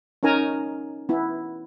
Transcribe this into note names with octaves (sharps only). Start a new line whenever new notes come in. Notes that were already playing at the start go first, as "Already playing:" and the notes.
C#4 D#4 A#4 G#5 A#5
B3 E4